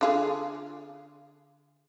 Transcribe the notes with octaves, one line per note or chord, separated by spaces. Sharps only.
D3 F4 G#4